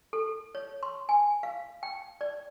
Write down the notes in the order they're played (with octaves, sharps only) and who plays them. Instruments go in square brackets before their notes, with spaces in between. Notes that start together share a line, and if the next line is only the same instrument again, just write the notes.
[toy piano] A4
C#5
C6
G#5
F5
G5
D5